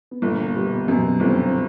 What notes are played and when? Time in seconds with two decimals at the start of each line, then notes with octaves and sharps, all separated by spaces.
0.11 B3
0.22 G1 A#2 A#3
0.55 B2 G3 B3
0.88 F#2 B2 B3
1.20 G1 C3 C4
1.47 C4